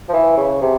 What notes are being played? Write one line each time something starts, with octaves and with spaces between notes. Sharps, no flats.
F3
E3
C#3
C3